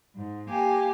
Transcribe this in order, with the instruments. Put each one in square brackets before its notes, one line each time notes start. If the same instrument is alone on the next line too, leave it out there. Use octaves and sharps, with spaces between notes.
[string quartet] G#2
A#3 G4 G#5